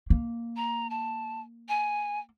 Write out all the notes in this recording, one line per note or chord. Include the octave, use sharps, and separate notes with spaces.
A#3
A#5
A5
G#5